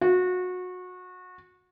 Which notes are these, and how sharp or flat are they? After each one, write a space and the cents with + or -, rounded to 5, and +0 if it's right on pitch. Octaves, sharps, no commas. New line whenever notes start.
F#4 -25